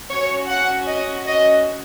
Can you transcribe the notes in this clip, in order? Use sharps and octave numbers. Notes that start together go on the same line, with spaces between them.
C#4 F#4 C#5
F#5
D#5
D#5